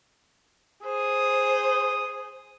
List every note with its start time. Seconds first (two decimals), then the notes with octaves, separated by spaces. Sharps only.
0.83 G#4 C5 D#6